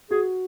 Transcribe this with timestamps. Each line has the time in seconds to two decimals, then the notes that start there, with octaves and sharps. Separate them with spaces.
0.11 F#4 G#4